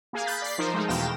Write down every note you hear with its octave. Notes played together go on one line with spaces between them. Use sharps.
A#3 G#4 F5
B5 F#6 G6 A6 B6
D5 B6 C7
F3 D#4 A#4 C5
G#3 A3 D#4
E2 B2 F5 G5 A#6 E7